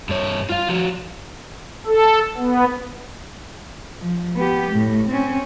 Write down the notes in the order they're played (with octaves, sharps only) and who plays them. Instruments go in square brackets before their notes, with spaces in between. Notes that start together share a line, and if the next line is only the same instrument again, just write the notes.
[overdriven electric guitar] G2 C#5
F4 F5
F3 F#4
[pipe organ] A4
B3
[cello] F3
B3 G4
A2
C4 C#4